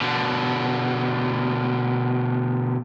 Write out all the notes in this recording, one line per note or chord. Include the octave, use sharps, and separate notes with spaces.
B2 D3